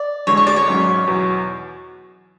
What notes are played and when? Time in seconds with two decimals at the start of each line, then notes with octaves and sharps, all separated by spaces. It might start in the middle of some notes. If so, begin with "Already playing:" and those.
Already playing: D5
0.27 E2 D3 G#3 C#5
0.37 C#5
0.47 D5
0.56 C#5
0.67 G#1 G#2 F#3 C#4
1.07 E2 B2 F#3